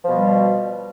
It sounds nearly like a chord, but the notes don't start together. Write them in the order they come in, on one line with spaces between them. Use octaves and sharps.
F3 B2 G3